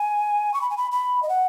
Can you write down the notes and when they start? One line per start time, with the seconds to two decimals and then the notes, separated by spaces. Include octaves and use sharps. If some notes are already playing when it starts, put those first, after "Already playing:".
Already playing: G#5
0.54 C#6
0.61 B5
0.70 G#5
0.77 B5
0.92 B5
1.23 D#5
1.29 F#5